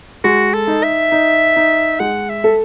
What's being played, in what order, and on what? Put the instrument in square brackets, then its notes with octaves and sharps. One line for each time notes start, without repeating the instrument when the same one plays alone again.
[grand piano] G#3 [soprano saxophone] F#4
[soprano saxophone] A4
[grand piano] D#4
[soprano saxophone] E5
[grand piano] D#4
D#4
[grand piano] G#3 [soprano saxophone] F#5
[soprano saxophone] E5
[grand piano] A4